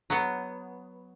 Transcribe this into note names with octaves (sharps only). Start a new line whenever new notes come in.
F#3 B3